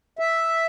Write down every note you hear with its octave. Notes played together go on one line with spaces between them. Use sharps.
E5